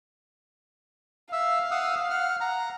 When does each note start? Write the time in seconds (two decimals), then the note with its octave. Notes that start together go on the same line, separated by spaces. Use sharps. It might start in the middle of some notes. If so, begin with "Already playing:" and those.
1.32 E5 F5 E6
1.71 F#5 D#6 E6
2.10 F#5 F6
2.41 F#5 A#5